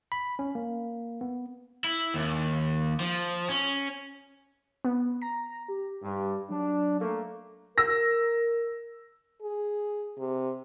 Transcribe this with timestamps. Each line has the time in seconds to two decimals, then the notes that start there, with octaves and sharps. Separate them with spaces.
0.12 B5
0.39 C#4
0.55 A#3
1.21 B3
1.84 E4
2.14 D#2
3.00 F3
3.49 C#4
4.85 B3
5.22 A#5 A#6
5.68 G4
6.02 G2
6.50 F#3 D4
6.99 A3 A#3
7.78 A#4 E6 A#6
9.42 G#4
10.18 C3